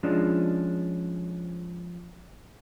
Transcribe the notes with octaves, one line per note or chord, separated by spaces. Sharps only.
F3 G#3 C#4 D4